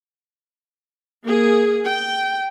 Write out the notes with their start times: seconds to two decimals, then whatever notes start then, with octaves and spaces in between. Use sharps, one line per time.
1.24 A#3 G#4
1.85 G5